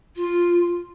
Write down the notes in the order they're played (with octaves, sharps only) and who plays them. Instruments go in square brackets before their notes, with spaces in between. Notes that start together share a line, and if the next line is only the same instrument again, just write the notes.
[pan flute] F4